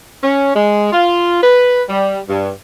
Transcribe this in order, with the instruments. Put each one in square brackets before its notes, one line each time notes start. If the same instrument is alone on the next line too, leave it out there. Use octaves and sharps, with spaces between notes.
[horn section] C#4
G#3
F4
B4
G3
G2